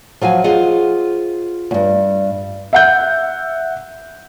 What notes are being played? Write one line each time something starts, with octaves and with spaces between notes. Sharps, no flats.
F3 F#3 F5 G#5
F4 G#4 C5 D#5 F5 F#5
E2 G2
E5 F#5 G6